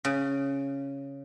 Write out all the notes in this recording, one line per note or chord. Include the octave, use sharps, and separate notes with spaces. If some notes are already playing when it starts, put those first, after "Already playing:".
C#3